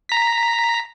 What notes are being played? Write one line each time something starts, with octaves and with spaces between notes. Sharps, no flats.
A#5 B6